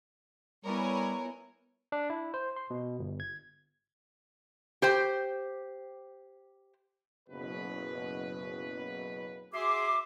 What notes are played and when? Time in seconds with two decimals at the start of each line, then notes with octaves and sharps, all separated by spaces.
0.65 G3 B3 E4 A#4 C#5 G#5
1.92 D4
2.10 E4
2.34 C5
2.56 C6
2.70 B2
2.99 G1
3.20 G#6
4.82 G4 C5 G5
7.29 F#1 B2 B4
9.54 F#4 G#4 E5 C6 D6